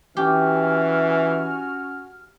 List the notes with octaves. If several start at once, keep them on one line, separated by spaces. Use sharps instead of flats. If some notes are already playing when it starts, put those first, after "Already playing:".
E3 C#4 F#4 G4 G#5 F6